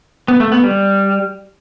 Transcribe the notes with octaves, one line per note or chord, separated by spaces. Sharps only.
B3
A3
B3
G3